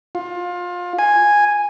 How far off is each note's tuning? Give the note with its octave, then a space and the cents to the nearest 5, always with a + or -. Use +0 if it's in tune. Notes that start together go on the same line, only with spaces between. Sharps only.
F4 +25
G#5 -5